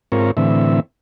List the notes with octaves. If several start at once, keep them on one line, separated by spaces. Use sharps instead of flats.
G#2 C4 F4 A#4 C#5
A2 D3 E3 C4 E5